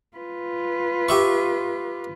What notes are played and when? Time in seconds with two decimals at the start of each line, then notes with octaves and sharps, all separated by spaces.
0.17 F4 B4
1.09 G4 E5 C#6